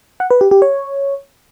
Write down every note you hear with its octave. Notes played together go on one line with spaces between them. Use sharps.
F#5
B4
G4
G4
C#5